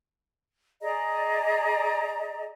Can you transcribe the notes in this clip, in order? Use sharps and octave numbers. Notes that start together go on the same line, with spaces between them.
G#4 D5 D#5 A#5